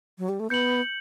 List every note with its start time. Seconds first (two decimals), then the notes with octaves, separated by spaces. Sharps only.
0.19 F#3
0.29 G3
0.40 A3
0.50 B3 G6 C#7 F#7